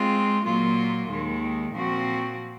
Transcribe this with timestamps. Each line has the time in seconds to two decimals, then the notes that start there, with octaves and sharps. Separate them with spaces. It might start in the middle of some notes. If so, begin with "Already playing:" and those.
Already playing: G#3 C4 F4
0.44 A#2 F#3 A#3 F4
1.08 D#2 D#3 G#3
1.73 A#2 F3 C4 F#4